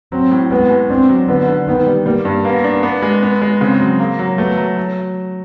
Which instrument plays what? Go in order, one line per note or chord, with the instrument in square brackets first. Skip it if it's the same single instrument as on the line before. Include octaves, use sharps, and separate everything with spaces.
[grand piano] F#3 [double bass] C4
[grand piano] A2
[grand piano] G#3 [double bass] B3
[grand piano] G#3
[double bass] C4 [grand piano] D4
[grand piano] F#3
[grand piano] D3 [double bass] B3
[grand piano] D3
[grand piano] D#3 [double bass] B3
[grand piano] G3
[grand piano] G3 [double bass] A#3
[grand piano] G2
[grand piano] A#3 [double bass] B3
[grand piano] D4
B3
G#3
B3
G#3
[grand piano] C#3 [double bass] C4
[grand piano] F#3
A#3
F#3
[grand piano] A3 [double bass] B3
[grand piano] F#3
F#3